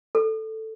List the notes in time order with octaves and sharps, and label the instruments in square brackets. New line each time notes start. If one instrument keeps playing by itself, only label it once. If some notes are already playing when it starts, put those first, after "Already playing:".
[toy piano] A4